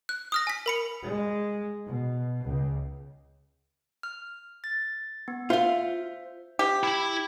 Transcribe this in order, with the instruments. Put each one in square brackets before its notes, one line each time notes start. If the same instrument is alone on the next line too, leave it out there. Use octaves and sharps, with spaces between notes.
[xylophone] F#6
D#6 F6 A#6
G#5 B6
A#4 B5 C#7
[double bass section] G#3
B2
C#2
[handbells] F6
A6
B3
[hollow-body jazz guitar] F4 F5 [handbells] C5 E5
[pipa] G4
[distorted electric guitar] E4 B5